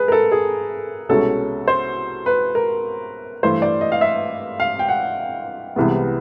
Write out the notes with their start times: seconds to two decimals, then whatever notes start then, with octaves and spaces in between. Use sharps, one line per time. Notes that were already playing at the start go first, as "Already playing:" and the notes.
Already playing: G#4 B4
0.08 A#4
0.12 A4
0.32 G#4
1.09 C2 B2 G#3 C#4 A4
1.68 C5
2.26 B4
2.55 A#4
3.43 G2 E3 A3 C5
3.62 D5
3.81 D#5
3.92 F5
4.01 E5
4.60 F5
4.79 G5
4.89 F#5
5.76 C2 C3 E3 G#3 B3